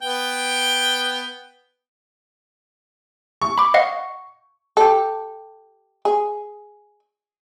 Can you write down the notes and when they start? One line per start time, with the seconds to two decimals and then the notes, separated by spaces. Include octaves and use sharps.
0.02 B3 G5
3.42 C#6
3.58 B5 D6
3.74 D#5 F5 F#5
4.77 G4 A4
6.05 G#4